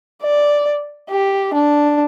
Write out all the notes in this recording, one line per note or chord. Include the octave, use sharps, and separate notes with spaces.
D5
G4
D4